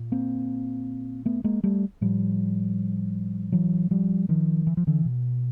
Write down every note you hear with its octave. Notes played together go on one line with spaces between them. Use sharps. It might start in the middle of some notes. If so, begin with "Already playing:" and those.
Already playing: A#2
A#3 C4
A3 B3
G#3 A#3
G3 A3
A2 F3 G3
E3 F#3
F3 G3
D#3 F3
E3
F3
D3 E3
B2